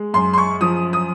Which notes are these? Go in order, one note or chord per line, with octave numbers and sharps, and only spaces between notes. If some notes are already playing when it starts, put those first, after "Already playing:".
Already playing: G#3
F#2 C6
C6
C#6
F3 D#6
D#6